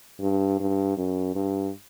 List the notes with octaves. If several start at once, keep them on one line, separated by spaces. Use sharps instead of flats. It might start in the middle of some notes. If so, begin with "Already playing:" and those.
G2
G2
F#2
G2